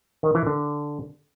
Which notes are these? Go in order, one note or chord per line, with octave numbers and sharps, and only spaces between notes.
D#3
E3
D3